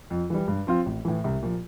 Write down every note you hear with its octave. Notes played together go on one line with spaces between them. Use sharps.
F2
E3 G3
G2
F3 C4 F4
A1
A2 E3
C2
A#2 F3